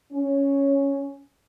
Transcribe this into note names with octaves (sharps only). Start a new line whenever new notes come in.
C#4